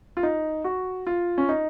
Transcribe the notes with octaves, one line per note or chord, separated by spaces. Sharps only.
F4
D#4
F#4
F4
C#4
D#4